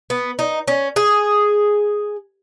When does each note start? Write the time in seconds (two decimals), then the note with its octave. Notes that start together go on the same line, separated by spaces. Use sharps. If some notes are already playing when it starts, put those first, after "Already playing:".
0.10 B3
0.39 D#4
0.68 C#4
0.96 G#4